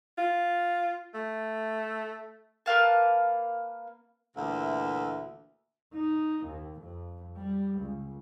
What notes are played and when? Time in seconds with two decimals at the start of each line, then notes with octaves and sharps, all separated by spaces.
0.18 F4
1.14 A3
2.66 A#3 B4 F5 A5
4.37 D2 A#2 E3 E5
5.94 D#4
6.46 D#2
6.80 F2
7.38 G3
7.79 C#2